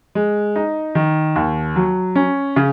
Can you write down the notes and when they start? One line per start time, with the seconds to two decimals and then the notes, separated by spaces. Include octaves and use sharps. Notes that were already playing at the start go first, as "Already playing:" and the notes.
0.15 G#3
0.56 D#4
0.95 D#3
1.36 D#2
1.76 F#3
2.16 C#4
2.56 C#3